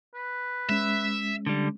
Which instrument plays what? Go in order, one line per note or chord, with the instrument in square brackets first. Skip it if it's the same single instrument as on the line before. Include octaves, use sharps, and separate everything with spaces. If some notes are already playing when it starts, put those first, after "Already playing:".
[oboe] B4
[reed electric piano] G#3 C#4 [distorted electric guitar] E5
[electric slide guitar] D3 G3